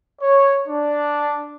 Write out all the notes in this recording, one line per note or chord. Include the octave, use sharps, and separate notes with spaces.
C#5
D4